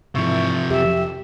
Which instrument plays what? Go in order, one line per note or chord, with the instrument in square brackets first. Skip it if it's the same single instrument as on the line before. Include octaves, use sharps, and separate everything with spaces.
[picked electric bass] G#2 E3 [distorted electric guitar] C3 F3 [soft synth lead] E5 [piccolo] C#6
[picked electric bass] F2 F#3 [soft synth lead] G4 [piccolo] E5